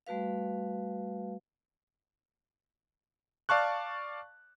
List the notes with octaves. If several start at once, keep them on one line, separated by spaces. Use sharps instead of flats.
G3 A3 F#4 B4 F5
D5 F5 A5 C#6 F#6